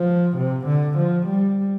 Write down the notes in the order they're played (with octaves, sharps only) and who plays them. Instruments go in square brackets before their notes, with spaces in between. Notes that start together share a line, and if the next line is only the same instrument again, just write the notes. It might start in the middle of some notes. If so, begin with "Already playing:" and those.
Already playing: [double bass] F3
C3
D3
F3
G3